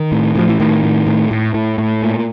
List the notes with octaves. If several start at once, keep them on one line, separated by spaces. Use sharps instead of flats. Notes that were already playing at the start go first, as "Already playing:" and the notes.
Already playing: D#3
A2
A2 F3
E3
A2 D#3
A2
A2
A2
A2
A2
A#2